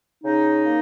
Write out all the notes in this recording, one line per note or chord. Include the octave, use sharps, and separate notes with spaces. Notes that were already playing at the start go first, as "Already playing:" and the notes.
C#3 D#4
A#3